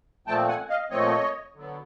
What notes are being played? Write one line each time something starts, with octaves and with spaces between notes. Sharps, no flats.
A#2 F3 A3 C4 G5 A5
F#5 G#5
D#5 F5
A#2 F3 A3 C4 C#5 D#5
D3 F#3 B3